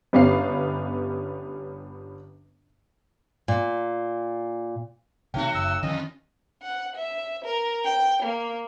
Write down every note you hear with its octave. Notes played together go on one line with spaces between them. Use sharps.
G1 G3 B3 C#4 F5 C7
A#2
C3 E3 A3 C4 D#4 F#4 C#5 G5
F#1 E6
F2 D#3 E3 D#5
F#5
E5
A#4
G5
A#3